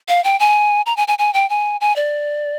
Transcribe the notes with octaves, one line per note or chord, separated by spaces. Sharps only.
F5
G5
G#5
A#5
G#5
G#5
G#5
G5
G#5
G#5
D5